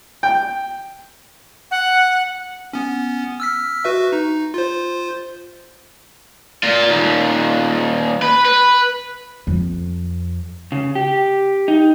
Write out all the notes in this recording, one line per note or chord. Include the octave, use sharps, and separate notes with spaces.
G5
F#5
B3 C#4
E6 F6 B6
F#4 B4 E5
D#4
F4 C5
A#2 F4
D#2 A#2
B4
B4
F2
C#3
G4
D#4